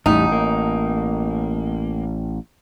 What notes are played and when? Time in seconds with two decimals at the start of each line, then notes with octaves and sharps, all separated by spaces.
0.06 A1 E2 A2 G3 D#4
0.32 A#3